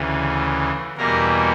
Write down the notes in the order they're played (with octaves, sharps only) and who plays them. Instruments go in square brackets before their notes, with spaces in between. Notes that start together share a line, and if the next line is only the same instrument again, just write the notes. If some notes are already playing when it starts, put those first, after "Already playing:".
Already playing: [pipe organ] D2 C#3 E3
E2 B2 G3 A#3 A#4